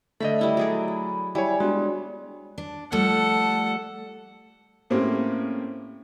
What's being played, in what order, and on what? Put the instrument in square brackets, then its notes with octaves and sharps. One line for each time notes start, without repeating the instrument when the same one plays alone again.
[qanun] D3 B5 [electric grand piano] A3 D#5 [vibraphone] A4 E5
[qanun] G3 E4 B5
F#3 G#4 D5
[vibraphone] B5
[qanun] G3 [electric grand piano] E4 C#5 [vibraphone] G#5
[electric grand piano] G#3 [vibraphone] B3 D4 F#4
[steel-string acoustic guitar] D4
[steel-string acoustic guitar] F3 G3 A3 [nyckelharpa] A4 F#5
[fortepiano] A2 A#3 C4 C#4 G4